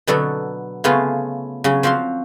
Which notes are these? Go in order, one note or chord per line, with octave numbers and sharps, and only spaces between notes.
B2 D3 F#3 B3 A4
C#3 A3 B3 C#4 F4
C#3 F#3 C#4
F3 C4 F#4 F5 C6